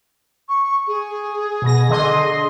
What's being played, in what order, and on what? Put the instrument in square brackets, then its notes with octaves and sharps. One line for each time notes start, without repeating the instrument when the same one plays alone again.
[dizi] C#6
G#4
[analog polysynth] B2 A#6
D3 D#5 C6